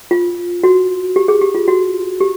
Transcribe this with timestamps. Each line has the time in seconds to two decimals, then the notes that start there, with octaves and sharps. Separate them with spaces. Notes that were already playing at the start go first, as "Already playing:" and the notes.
0.11 F4
0.64 F#4
1.16 G4
1.28 G#4
1.41 G4
1.55 F4
1.68 F#4
2.21 G4